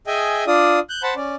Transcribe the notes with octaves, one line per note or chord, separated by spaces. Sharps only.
G#4 D#5 E5 G5 G#5
D4 F4 D5 D#6
F#6 G6
C5 F#5 A5 B5
C#4 D5